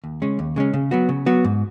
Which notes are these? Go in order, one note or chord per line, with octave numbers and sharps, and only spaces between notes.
D#2
C#3 G#3 C#4
D#2
C#3 G#3 C#4
C#3
F#3 B3 F#4
C#3
F#3 B3 F#4
G#2